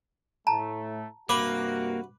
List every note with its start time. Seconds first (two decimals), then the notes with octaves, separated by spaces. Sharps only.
0.47 A2 A3 A5 A#5
1.29 G2 C3 A#3 F#4 B4 D6